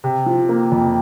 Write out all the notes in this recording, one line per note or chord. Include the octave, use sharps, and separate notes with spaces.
C3
F3
A#3
F2